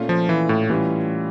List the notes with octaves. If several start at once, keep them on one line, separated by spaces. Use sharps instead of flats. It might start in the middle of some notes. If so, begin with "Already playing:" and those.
Already playing: A#2 A3 C#4 F4
F3
E3
A2
A2 E3 G3 C#4 F4